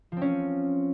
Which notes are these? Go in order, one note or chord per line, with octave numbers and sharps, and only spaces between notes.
F3 C4 C#4